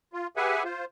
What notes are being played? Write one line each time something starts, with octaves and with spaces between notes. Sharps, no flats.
F4
G4 G#4 B4 E5 F#5 G#5
F4 C5